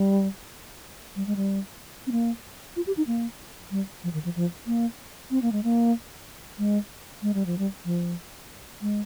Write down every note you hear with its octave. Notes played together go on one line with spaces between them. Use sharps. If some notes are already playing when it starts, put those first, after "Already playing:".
Already playing: G3
G3
G#3
G3
C4
A#3
F4
G4
D#4
A#3
G3
F3
D#3
F3
F3
A#3
C4
A#3
G#3
A#3
G#3
G#3
G3
F3
G3
F3
G#3